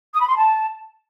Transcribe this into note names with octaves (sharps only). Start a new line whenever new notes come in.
D#6
B5
C6
A5